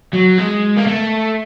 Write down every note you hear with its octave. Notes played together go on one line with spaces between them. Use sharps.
F#3
G#3
A#3
A3